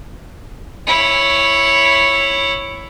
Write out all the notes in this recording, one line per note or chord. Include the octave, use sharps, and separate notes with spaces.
E4 C#5